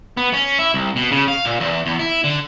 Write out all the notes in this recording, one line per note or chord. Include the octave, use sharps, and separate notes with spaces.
B3
C#4
E4
C2
B2
C#3
F5
A#2
E2
E2
E4
D3